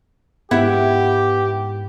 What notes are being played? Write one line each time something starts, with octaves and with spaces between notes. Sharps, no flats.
G#2 B3 E4 G4 E5 F#5